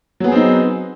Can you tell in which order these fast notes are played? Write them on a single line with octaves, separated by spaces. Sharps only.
F#3 B3 G#4 C4 D#4